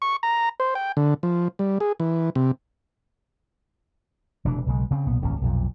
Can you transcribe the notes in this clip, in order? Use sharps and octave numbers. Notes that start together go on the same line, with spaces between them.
C#6
A#5
C5
G5
D3
F3
G3
G#4
E3
C3
F1 B2 E3 D4
B1 C#3 G#3
C#3 C4
B1 A#2 B3
D#1 G#1 C#2 C#4
B1 F2 A#2